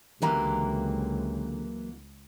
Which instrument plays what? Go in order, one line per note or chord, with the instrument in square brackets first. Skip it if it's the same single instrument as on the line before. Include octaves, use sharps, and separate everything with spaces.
[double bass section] C#2 [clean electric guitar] D3 G4 A#4 [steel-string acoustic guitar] E3 F#3 A#3